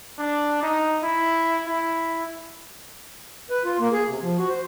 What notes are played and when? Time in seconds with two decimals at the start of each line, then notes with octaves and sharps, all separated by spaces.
0.19 D4
0.63 D#4
1.03 E4
1.66 E4
3.50 B4
3.65 F4
3.80 A#3
3.92 G#4
4.09 C3
4.22 F3
4.38 F#4
4.49 C5